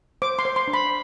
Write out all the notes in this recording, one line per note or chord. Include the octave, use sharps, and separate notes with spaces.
C5 D6
C6
C5
C6
D4
B5